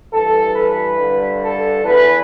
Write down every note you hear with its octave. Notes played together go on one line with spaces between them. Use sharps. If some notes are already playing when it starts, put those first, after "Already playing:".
G2 E3 A4
B4
G2 D3
A4
E2 E3 B4